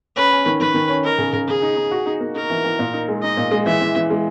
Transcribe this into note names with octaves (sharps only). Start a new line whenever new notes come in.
C#4 B4
C#4
D#3
D#3 B4
D#3
C#4
D#4 A#4
C#3
C#3
C#3 G#4
D#4
D#4
F#4
D#4
A#3
D#4 A#4
E3
E3
A#2
D#4
G#3
D#4 D#5
A#2
G#3
E3 E5
E3
E3
G#3